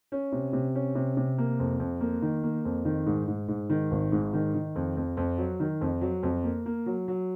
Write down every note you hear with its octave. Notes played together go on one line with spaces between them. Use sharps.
C#4
C3
C3
C#4
C3
C3
A#3
F2
F2
A#3
D#3
A#3
F2
D#3
G#2
G#2
G#2
D#3
G#1
G#2
D#3
D#3
F2
F2
F2
F#3
D#3
F2
F#3
F2
A#3
A#3
F#3
F#3